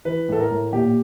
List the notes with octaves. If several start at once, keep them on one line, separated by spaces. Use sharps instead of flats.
E3 B4
A2 A4
A#4
A2
A#2 G4